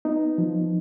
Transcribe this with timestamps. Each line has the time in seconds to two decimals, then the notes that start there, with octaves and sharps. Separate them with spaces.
0.05 B3 D#4
0.38 F3